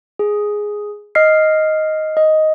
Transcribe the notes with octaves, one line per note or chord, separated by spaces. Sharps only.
G#4
D#5 F6 C7
D#5